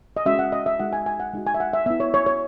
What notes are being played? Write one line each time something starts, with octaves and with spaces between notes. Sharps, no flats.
D#5
G#3 C#4 F#4 E5
F#5
D#5
E5
G#3 D#4 F#4 F#5
G#5
G#5
F#5
G#3 D#4 F#4
G#5
E5
F#5
E5
B3 E4 E5
C#5
C#5
C#5